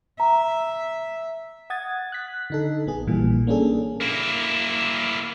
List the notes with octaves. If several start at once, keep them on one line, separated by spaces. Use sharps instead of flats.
E5 A#5
F#5 D#6 G#6 A6
F#6 B6
D3 D#4 A4
A#1 B3 G#4
A#1 A#2 E3 G3
A#3 C#4 D4 G#4 A4
A#3 E4